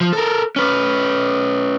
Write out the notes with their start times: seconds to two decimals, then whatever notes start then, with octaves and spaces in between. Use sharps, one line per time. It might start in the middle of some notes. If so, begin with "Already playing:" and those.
0.01 F3
0.13 A4 A#4
0.56 C#4 B4